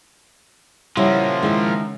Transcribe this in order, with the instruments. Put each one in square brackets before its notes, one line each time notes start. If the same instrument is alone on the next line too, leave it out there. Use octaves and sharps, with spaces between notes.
[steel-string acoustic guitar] C#3 F#5 [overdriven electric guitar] F3 A#3 [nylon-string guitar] G3 [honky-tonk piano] E4
[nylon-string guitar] D#3 [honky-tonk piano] G#3 E4